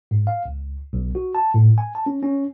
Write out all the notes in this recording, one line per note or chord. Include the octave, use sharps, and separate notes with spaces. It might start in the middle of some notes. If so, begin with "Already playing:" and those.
G#2
F5
C#2
B1
F#4
A5
A2
G#5
A5
C#4
C#4